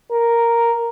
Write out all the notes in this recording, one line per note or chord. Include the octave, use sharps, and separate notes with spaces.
A#4